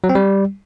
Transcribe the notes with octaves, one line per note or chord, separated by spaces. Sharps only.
F#3
C4
G3